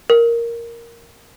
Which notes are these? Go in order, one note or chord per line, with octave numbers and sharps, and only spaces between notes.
A#4